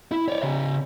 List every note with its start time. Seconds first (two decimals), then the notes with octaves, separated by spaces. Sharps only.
0.12 E4
0.28 C#5 D5
0.42 C#3 E5